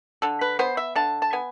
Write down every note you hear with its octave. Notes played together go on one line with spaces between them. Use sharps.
D3 A4
B4
B3 C5
E5
D3 A5
A5
B3 G#5